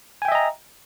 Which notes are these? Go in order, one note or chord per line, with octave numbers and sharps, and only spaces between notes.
D#5 E5 G5 G#5 A#5